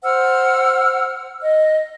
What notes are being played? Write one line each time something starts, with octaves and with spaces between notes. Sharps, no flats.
C5 F#5 E6 F6
D#5